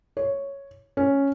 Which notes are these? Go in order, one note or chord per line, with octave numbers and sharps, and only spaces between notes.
C#5
C#4